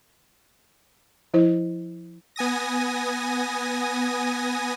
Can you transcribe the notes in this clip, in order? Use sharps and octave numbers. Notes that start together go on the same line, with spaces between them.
F3 E4 C5
B3 G#5 D#6 A#6